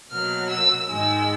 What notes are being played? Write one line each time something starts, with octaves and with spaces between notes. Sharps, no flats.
B2 F#3 A#3 F6
E6
G#2 D#3 G#3 E6